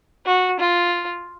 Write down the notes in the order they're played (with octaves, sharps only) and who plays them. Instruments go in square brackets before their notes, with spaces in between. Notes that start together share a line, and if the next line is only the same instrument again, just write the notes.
[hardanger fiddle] F#4
F4